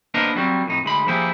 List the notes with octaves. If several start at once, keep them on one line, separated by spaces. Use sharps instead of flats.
A#3 B3 D4 A#4 C5 D#5
F#3 G3 A#3 C4 F#4
F2 A2 D#4
D2 G#3 B5
F3 A#3 E4 G4 G#4